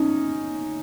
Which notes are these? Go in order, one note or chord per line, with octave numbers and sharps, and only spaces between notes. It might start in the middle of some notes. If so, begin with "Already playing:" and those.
Already playing: C#4 D#4